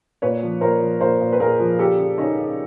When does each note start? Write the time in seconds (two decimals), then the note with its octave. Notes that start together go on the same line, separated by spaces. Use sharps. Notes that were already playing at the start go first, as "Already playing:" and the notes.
0.22 A#2 B4 C#5
0.43 F3
0.61 A#2 A#4 C5
0.81 F3
1.00 A#2 A#4 C5
1.20 A#2
1.33 B4
1.40 A#2 G#4 A#4
1.59 F3
1.79 C#3 G4 A4
1.98 C#3
2.18 C#3 C#4 D#4
2.37 C#3